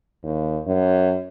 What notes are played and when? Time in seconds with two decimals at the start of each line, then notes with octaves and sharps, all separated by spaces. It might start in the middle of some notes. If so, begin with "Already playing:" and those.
0.23 D#2
0.67 F#2